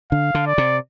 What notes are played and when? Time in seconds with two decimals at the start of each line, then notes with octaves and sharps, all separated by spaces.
0.11 D3 F5
0.35 D3
0.47 D5
0.58 C3